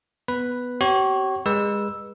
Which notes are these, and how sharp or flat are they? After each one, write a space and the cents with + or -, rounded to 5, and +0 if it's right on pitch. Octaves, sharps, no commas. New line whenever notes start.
B3 +0 B4 +0 B5 +0
C4 +0 G4 -45 C#5 -20
G#3 -25 B4 -30 E6 +0